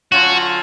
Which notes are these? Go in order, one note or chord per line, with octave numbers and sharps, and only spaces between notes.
D3 F#3 C#4 F4 F#4